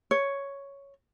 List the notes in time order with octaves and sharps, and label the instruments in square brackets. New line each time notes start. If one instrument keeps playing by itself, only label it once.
[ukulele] C#5